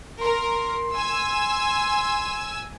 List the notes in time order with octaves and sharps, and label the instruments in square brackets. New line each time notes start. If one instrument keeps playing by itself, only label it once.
[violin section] A#4 [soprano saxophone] C6
[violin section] G#5 E6